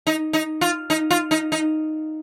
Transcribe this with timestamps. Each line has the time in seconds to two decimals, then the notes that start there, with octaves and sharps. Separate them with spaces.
0.07 D#4
0.33 D#4
0.61 F4
0.90 D#4
1.11 F4
1.31 D#4
1.52 D#4